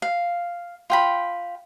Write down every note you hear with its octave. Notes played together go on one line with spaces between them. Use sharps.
F5
F4 G5 B5